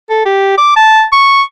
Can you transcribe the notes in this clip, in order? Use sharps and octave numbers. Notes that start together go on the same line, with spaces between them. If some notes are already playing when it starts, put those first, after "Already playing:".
A4
G4
D6
A5
C#6